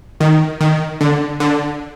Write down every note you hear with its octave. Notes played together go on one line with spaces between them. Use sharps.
D#3
D#3
D3
D3